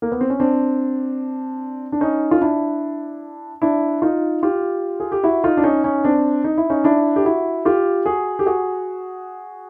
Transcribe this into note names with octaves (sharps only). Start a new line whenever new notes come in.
A#3
B3
C4
C#4
C4 D4
D4
C#4 D#4
F4
D4 E4
D4 E4
D#4 F4
F4 G4
G#4
G4
E4 F#4
D#4 F4
D4
C#4 D#4
C#4 D#4
C4 D4
D#4
E4
C#4 D#4
D4 E4
G4
E4 F#4
F4 G4
F#4 G#4
G4
F#4 G#4